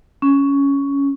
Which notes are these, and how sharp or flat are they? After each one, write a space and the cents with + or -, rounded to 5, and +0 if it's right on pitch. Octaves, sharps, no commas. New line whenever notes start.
C#4 +10